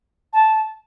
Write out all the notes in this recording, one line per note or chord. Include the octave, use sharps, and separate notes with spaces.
A5